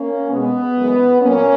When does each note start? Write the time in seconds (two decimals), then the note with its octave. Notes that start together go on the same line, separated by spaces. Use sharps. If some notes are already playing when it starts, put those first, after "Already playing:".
Already playing: A#3 C#4
0.30 B2 G#3 B3
0.76 F#2 E3 G#3
1.21 A#2 F#3 A#3 C#4